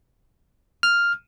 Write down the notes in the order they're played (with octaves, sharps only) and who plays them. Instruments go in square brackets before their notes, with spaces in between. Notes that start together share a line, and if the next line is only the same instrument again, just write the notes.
[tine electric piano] F6